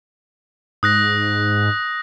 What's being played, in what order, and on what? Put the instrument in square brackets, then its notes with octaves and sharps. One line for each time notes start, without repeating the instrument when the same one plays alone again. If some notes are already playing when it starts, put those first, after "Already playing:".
[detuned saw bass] G#2 [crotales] D#6 F#6 A#6